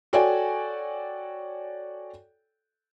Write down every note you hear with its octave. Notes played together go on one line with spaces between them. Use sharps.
F#4 A4 C#5 D5 G5 G#5